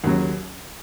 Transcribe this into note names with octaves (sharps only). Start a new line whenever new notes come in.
D#2 C#3 F#3